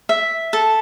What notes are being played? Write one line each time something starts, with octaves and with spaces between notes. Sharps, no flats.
E5
A4